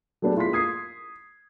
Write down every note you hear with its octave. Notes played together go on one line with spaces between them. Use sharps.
F#3 A3 B3 D4 G4 G#4
E4 F4 G#4 C6 B6
D#6 G#6 C7